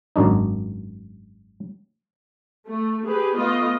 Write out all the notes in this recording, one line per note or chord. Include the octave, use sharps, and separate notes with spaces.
G#1 F#2 D4 D#4
A3
G4 G#4 B4
A3 B3 F4 D#5